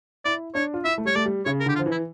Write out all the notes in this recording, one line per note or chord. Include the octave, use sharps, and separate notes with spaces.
E4 D5
D4 C#5
F4
E4 E5
A3
G3 C#5
A3 D5
G3
C#3 C#5
A#4
D3 G4
F4
F3
E3
E4